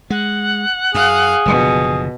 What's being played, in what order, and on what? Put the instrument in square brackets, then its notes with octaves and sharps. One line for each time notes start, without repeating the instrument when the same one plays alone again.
[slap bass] G#3 [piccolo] F#5
[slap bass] F#2 [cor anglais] G#4 [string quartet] F5
[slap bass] F#1 D3 F3 [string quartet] B2